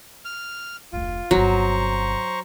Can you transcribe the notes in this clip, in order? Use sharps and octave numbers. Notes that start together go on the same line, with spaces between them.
F6
F1 D2 F4
G1 C3 F#3 C5 A#5 C#6